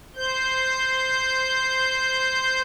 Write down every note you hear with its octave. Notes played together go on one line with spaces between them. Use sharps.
C5 G6